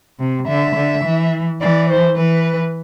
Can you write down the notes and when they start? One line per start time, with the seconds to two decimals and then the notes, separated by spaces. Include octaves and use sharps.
0.20 C3
0.48 D3 E5
0.76 D3
1.04 E3
1.61 E3 D5
1.89 C5
2.17 E3 B4